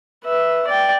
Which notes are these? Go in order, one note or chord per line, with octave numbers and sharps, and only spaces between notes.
B4 E5
D5 G5